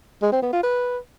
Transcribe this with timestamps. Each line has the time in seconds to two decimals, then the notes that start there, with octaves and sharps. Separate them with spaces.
0.22 G#3
0.32 C4
0.43 B3
0.53 F4
0.63 B4